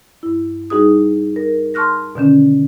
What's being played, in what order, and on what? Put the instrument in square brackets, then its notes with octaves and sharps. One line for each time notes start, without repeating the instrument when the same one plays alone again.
[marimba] G2 E4
G3 D#4 F#4 G#4 D#6
A#4
A5 C6 C#6 F6 F#6 A#6
B2 D3 D#3 C#4